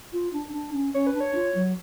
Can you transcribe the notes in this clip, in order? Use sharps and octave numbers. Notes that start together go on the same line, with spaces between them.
F4
D4
D4
C#4
C#4 C#5
B4
D4
C#5
F4
F#3